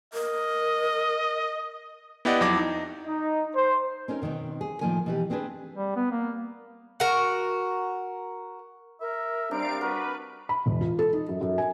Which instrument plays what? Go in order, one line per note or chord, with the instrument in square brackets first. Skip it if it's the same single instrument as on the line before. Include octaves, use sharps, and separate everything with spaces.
[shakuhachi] A#4 [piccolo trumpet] D#5
[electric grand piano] B3 E4 G4 D5 D#5 F#5
F2 F#3 E4 D6 A#6
D#4
[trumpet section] D#4
C5
[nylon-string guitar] C4 C#4 D#4 A#4
B2 D#3 B3 C4
G#4
A2 D#3 F3 A#3 G#5
B2 E3 G4
B3 C4 D4 G#4 B4
[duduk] G3
B3
A#3
[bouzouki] F#4 A#4
[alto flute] A#4 [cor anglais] E5
[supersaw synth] G3 F5 D7 [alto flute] C4 [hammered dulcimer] D4 [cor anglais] A#4
[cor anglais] F#4 [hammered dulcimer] A#4 [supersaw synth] B4
[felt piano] B5
E1
F4
A4
D#4
F#2
F#2
G#5